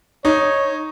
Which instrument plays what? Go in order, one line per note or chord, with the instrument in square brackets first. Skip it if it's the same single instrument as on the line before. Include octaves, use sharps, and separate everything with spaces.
[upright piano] D#4 [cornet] C#5